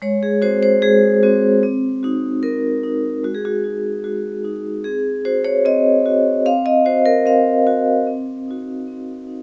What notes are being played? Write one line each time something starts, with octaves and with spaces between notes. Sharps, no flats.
G#3 C#5
G#4
C4 F#4 C5
C5
G#3 G#4
C4 F#4
C4
D#4 F#4
C4 A#4
D#4 F#4
G#3 F#4
G#4
F#4
D#4 F#4
G#3 F#4
D#4 F#4
C4 G#4
F#4 C5
C#5
C4 D#5
F#4
C4 F5
D#5
F#4 C5
A#4
C4 F5
F#4
C4
D#4 F#4
C4
D#4